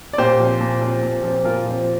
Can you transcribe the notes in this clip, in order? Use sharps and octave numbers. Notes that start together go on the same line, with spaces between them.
D5
A#2 G4 C5
F3 C4
A#2
F3 C4
A#2
F3 C4
A#2 F4 A#4
F3 C4